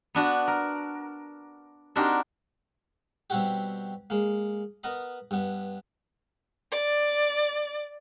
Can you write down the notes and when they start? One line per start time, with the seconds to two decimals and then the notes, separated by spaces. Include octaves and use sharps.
0.15 B3 D4 F#4
0.48 A#4
1.96 C4 D4 D#4 F#4 G4 A#4
3.30 B2 G3 C4 E4 F#4 G4
4.10 G#3 A#3
4.84 B3 A#4 D#5 B5
5.31 G2 B3
6.72 D5